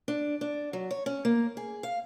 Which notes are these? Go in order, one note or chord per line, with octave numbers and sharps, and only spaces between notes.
D4
D4
F#3
C#5
C#4
A#3
G#4
F5